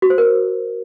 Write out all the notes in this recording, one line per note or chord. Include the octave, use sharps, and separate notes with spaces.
F#4
C5
A#4